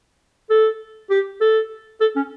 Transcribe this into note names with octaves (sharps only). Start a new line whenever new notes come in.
A4
G4
A4
A4
C#4